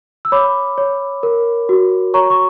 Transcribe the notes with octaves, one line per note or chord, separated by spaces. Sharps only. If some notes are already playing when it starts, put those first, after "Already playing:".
E6
C#5 B5 D6
C#5
A#4
F#4
C#5 A#5 C#6
C#6